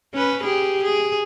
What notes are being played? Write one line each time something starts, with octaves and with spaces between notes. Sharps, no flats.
C#4 B4
G4 G#4
G#4